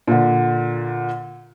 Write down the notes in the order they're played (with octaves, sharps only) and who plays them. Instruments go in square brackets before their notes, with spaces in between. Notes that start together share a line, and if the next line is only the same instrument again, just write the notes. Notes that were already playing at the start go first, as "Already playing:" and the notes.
[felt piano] A#2 D3